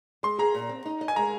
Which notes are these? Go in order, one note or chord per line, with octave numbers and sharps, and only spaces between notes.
G#3 C6
G#4 A#5
A#2
C4
D#4
D#5
G#5
G#3 A#5